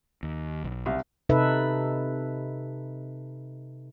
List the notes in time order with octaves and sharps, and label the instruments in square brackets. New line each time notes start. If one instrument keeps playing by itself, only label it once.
[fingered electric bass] D#2
B1
[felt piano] C2
[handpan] C3 D#4 A4 B4 E5